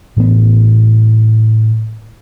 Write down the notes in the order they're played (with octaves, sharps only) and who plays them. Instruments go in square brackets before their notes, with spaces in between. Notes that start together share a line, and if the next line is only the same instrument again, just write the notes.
[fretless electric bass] A2 E3 A3 B3